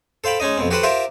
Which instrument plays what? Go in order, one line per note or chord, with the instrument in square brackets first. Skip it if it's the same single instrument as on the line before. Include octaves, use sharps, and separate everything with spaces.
[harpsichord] A4 C5 F5 G5 B5
G#3 C#4 D#4 D#5
F2 B2 C4
F#4 G4 A4 B4 C5 F#5
F4 G4 A#4 C5 E5